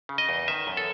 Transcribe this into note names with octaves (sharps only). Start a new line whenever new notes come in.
C#3
D#5
E2
D#3 E5
F#2
A4